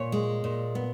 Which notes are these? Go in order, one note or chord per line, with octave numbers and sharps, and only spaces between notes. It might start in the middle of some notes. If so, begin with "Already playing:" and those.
Already playing: A#2 C#5
G#3
A#2
B3